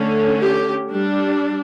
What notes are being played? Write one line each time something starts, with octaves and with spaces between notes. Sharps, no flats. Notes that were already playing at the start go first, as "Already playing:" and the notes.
Already playing: D3 A3 C#4
G4
G3 D4